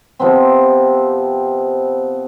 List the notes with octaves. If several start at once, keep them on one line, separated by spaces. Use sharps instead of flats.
C3 F3 B3 C4